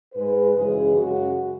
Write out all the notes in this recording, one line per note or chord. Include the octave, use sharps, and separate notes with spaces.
G#2 G#3 B4
F#2 C#3 E3 G#3 G#4
F#2 C#3 G#3 F#4